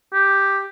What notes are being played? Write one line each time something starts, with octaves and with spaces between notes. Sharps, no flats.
G4